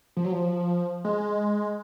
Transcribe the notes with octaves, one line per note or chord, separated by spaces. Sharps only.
F3
F#3
F3
G#3